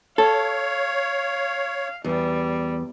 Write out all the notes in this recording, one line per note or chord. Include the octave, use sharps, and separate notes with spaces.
A4 C#5 F5
E2 G3